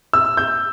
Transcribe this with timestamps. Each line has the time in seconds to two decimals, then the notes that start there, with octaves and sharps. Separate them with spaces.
0.13 E6
0.37 G6